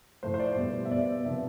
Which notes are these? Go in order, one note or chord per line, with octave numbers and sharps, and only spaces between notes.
A2 F3 A3 C5
C5
D5
B2 G3 B3
E5
B2 B3 D5
C3 F3 B3 E5